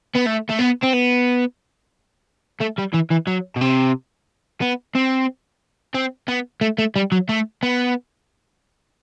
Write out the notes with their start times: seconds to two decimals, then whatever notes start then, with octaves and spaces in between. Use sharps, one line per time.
0.16 B3
0.27 A3
0.50 A3
0.60 B3
0.83 C4
0.94 B3
2.60 A3
2.78 G3
2.93 E3
3.10 E3
3.27 F#3
3.56 B2
3.61 C3
4.61 B3
4.95 C4
5.95 C4
6.28 B3
6.61 A3
6.78 A3
6.96 G3
7.12 F#3
7.29 A3
7.63 B3